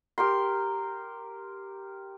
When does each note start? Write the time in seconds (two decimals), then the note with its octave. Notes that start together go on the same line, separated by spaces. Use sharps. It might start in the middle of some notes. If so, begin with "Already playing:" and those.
0.18 G4 A#4 C6